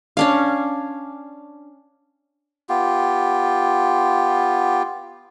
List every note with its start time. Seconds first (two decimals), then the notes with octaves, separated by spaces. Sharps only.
0.17 C#4 D4 F5
2.69 B3 F4 G4